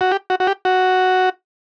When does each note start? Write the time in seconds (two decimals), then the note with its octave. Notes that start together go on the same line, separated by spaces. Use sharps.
0.01 F#4
0.11 G4
0.30 F#4
0.40 F#4
0.47 G4
0.65 F#4